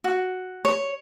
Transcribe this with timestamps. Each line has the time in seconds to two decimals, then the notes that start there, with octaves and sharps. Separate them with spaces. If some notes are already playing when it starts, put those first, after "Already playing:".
0.04 F#4
0.65 C#5